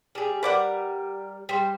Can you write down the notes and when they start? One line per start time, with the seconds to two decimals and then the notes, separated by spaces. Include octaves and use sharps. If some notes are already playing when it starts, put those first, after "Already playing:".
0.15 G3 G#4
0.43 G3 A#4 B4 D5 F#5
1.49 G3 C5